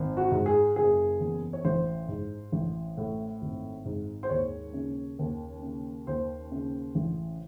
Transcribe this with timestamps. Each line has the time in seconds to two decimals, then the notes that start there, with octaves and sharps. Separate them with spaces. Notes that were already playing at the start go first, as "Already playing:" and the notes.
Already playing: G#1
0.17 F#4
0.32 G#2
0.46 G#4
0.76 F#1 G#4
1.21 E2
1.53 C#5
1.65 A1 C5
2.08 G#2
2.52 A1
2.97 A2
3.42 G#1
3.85 G#2
4.23 C5
4.30 D#2 C#5
4.74 C#3
5.19 D#2
5.63 C#3
6.07 D#2 C5
6.52 C#3
6.95 A1